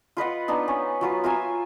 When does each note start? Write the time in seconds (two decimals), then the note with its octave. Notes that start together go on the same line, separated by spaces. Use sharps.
0.17 F4 B4 D#5 F#5
0.48 B3 D4 D#4
0.68 C#4
1.01 F#3 F4 B4
1.24 F4 A#4 E5 G#5